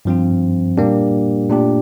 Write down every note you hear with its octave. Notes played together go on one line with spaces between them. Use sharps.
G2 F3 C4 F4
A#2 G3 A#3 D4 G4
A#2 A3 D4 G4